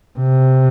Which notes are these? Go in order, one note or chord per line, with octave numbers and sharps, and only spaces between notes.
C3